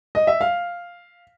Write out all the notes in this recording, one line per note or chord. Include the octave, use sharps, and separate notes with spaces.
D#5
E5
F5